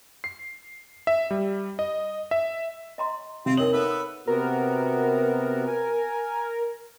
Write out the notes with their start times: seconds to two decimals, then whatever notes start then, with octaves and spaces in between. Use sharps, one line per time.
0.24 C7
1.07 E5
1.31 G3
1.79 D#5
2.31 E5
2.98 D#5 A#5 C6
3.46 C3 C4 F4
3.57 D#4 A#4 C#5 D#5 F#7
3.73 B3 D#4 A4 B4 E5
4.27 C3 B3 F#4 A#4
5.67 G#5